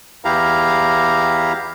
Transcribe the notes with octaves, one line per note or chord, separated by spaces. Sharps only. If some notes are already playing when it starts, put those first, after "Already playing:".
E2 E4 G4 F5 A#5